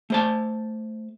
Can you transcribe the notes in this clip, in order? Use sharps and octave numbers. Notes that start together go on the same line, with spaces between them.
A3 C5 A5